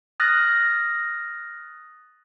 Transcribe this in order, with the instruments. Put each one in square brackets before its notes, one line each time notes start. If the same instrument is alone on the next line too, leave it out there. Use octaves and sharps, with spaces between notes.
[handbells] D#6 F6 F#6 A6 A#6